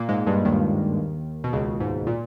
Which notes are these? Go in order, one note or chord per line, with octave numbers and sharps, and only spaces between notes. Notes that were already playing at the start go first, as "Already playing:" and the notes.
Already playing: A#2 A#3
G#2 G#3
G2 G3
D#2 D#3
B2
C#2 C#3
G#2
A#2